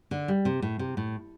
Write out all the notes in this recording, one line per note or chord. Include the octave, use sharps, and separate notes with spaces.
D3
G3
C3
A2
C3
A2